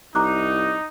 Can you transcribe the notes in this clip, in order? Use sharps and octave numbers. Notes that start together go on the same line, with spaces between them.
C2 D#4 A#5 D6 F#6